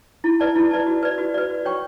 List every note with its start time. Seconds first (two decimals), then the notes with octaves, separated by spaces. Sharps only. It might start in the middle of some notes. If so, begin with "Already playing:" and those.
0.24 E4
0.40 B4 D5 A5
0.55 E4
0.71 B4 D5 A5
0.87 F#4
1.03 B4 D5
1.18 F#4
1.34 B4 D5
1.49 F#4
1.65 C#5 G5 C#6